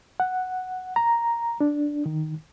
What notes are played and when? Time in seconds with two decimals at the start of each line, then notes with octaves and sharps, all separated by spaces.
0.20 F#5
0.96 A#5
1.61 D4
2.06 D#3